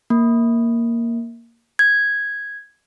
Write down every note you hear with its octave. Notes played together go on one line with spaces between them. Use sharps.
A#3
G#6